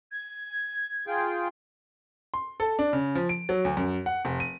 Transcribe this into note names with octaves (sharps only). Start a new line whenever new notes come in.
G#6
F4 G#4 G5
C6
A4
D4
C#3
F3
D7
F#3
D2
F#2
F#5
F1
D#7